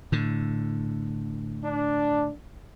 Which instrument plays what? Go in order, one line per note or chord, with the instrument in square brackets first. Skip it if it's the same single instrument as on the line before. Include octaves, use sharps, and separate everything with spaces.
[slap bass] A2 D3
[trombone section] D4